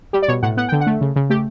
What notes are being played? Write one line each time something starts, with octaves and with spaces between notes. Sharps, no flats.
G3 G4
D5
B2 C#5
A2 F#5
B3 F#5
D3 G5
F#5
A3
C#3
C#3
A3 G4